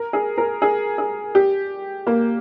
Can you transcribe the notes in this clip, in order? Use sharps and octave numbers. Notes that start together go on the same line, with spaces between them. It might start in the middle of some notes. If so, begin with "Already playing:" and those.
Already playing: A#4
G#4
A#4
G#4
G#4
G4
A#3